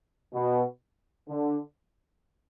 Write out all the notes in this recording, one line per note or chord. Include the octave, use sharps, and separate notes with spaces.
B2
D3